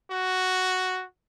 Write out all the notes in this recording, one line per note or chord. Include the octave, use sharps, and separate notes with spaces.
F#4